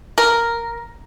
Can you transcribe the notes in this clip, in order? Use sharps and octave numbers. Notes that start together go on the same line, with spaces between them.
A#4